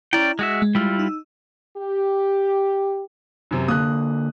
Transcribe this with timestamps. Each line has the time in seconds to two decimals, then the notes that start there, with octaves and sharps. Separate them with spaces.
0.13 C#4 E4 D5 G5 A#5
0.39 G#3 F#4 E5
0.62 G#3
0.75 G3 E4 F4
0.99 D#4 E6
1.77 G4
3.51 F#2 C3
3.68 D3 A#3 D#6 F#6